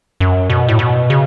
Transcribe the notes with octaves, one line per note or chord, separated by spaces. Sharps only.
F#2
B2
A2
B2
C#3